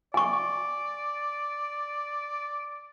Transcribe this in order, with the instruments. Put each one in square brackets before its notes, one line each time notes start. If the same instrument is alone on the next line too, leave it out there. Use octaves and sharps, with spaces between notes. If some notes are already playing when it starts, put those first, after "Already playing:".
[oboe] D5 [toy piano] G#5 C#6